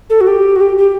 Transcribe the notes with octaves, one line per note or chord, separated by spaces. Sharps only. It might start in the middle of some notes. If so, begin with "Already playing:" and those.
A4
F#4
G4
F#4
G4
G4